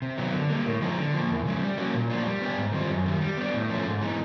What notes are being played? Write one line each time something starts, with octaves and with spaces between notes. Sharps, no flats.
C3
D#3 F#3 B3
D3
G3 A#3
A2
F3 G#3 B3 D#4
D3
F3 A#3
E2
C#3 F3 G#3 C#4
G3
A#3 C#4 F#4
A#2
F3 A#3 D4 F4
G3
B3 D4 G4
G#2
D#3 G3 C4 F4
F#2
D#3 G3
G3
B3 D4
A2
F3 A3 C#4
G#2
E3 G#3 B3 D#4